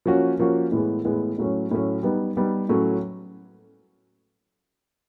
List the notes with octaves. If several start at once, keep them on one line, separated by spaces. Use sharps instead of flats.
F3 A#3 C#4 F#4
F3 A#3 C#4 F#4
A2 E3 G#3 B3
A2 E3 G#3 B3
A2 F#3 A3 C#4
A2 F#3 A3 C#4
G3 B3 D#4
G3 B3 D#4
A2 F#3 A3 C#4